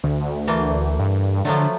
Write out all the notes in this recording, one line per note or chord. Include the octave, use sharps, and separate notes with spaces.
D2
E3 A3 A#3
G2
D3 F3 F#3 A3